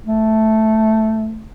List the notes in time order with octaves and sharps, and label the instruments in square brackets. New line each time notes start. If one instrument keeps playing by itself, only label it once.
[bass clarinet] A3